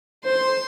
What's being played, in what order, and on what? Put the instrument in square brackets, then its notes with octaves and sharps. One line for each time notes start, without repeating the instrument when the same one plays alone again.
[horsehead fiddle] C5 [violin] C6